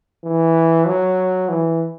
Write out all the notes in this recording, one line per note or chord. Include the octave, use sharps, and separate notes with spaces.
E3
F#3
E3